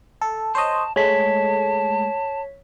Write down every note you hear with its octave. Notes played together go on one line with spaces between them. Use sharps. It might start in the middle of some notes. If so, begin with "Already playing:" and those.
A4
C5 C#5 D#5 A5
G#3 A3 C#5 A5 B6